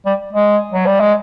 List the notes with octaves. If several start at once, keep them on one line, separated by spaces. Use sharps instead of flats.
G3
G#3
F#3
G3
G#3